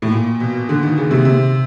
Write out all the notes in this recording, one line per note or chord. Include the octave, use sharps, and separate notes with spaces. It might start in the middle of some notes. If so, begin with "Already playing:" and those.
A2
A#2
B2
D3
D#3
C#3
C3
C3